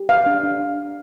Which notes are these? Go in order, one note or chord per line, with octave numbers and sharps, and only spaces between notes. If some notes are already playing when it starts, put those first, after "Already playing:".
Already playing: G4
B4 F5
D4
D4